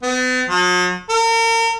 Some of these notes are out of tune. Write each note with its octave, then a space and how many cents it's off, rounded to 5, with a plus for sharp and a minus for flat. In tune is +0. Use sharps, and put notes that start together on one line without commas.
B3 +45
F#3 -45
A#4 -35